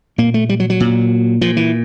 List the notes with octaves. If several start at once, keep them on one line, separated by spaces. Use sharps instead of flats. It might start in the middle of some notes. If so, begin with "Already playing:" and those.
A#2 A#3
A3
G3
F#3
F#3
A#2
A#2 F3
E3